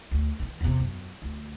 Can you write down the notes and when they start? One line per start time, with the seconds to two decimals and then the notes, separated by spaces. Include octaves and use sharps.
0.11 D2
0.40 D#3 E3
0.61 E2 C3
0.80 F#2
1.22 D2